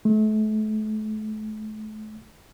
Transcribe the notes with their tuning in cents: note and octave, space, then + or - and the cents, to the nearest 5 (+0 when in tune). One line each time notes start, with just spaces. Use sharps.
A3 -35